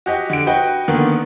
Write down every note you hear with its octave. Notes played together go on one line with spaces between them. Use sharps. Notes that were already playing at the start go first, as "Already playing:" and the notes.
F#4 G4 D#5
D3 D7
F#4 B4 D#5 G5
D3 D#3 A#3 B3